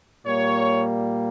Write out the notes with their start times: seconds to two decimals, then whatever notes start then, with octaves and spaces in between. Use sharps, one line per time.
0.25 A#2 G3 A#3 C#5